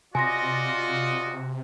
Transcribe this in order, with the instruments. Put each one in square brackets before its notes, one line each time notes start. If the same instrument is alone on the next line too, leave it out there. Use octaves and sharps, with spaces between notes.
[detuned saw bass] C3 [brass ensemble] F4 D5 D#5 [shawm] F#4 [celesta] G#5 C6 A#6